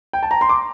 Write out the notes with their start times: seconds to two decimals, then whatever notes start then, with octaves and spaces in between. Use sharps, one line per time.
0.13 G5
0.23 A5
0.31 A#5
0.41 C6
0.49 D6